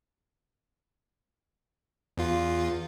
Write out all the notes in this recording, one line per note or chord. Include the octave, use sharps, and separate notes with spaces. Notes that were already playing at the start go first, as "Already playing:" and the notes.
E2 F4